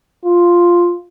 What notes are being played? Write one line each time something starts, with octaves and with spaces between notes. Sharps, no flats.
F4